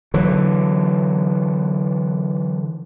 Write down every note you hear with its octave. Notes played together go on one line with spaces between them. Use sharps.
D3 E3 F#3